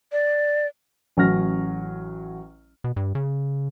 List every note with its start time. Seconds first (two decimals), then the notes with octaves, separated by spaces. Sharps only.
0.12 D5
1.17 A1 F#3 C#4 F6 A#6
2.84 B2
2.96 G2
3.15 C#3